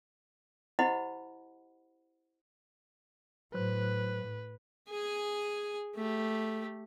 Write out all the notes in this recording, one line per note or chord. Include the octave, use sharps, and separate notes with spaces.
E4 G4 C5 D#5 F#5 B5
A2 F#3 B4 C5 F#6
G#4 G#5
A3 G4